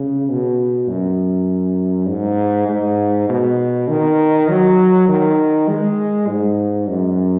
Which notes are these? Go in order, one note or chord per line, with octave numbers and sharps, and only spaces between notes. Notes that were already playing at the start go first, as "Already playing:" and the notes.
Already playing: C#3
B2
F#2
G#2
G#2
B2
D#3
F#3
D#3
G#3
G#2
F#2